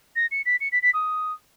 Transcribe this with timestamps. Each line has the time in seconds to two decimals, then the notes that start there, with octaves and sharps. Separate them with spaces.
0.16 A#6
0.31 C#7
0.46 B6
0.61 C#7
0.72 B6
0.82 B6
0.94 D#6